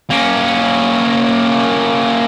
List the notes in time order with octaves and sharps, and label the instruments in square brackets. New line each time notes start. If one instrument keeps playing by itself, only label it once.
[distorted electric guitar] A#3 C#4